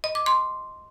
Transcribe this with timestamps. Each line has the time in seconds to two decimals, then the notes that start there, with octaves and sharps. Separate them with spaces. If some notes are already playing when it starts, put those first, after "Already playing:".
0.04 D#5
0.15 D6
0.26 C6